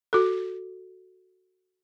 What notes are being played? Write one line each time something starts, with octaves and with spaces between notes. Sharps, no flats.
F#4 A4